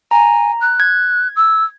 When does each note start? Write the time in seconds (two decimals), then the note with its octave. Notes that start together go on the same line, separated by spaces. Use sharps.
0.11 G#5 A#5
0.61 F#6
0.80 G#6
1.36 E6